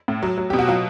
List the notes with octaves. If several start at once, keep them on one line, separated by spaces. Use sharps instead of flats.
A2
F#3
F#3
B2 G4
F#4
F#3 F4